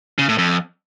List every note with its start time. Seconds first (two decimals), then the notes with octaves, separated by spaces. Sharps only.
0.19 C#3
0.28 A2
0.38 F2